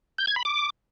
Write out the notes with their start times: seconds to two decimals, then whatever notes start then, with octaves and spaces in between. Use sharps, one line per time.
0.18 G6
0.27 G#6
0.36 B5
0.45 D6